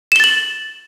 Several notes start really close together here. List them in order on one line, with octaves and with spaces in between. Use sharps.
E7 G7 A6 F#7